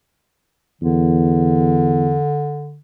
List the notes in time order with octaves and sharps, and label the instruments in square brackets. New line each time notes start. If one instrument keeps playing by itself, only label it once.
[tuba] E2 [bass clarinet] D3